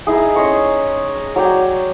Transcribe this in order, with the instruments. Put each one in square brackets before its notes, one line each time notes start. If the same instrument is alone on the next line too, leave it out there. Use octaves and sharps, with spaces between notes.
[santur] D#4 E4 G#4
C#4 D#5 C6 C#6
F#3 C#5 D5 G5